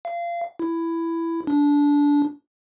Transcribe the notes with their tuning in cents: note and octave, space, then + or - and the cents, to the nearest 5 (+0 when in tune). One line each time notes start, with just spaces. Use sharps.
F5 -25
E4 +10
D4 -20